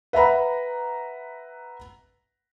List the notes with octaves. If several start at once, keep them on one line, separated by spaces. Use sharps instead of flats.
B4 E5 F#5 A#5 B5